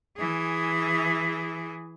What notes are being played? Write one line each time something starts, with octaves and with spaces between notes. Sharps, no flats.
E3 G#4